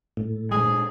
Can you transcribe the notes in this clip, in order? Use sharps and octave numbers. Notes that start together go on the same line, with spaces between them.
A2
A#2 G#3 G#4